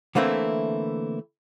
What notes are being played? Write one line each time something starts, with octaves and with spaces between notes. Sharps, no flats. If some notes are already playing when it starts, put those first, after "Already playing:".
D3 E3 A3 A#3 C4 E4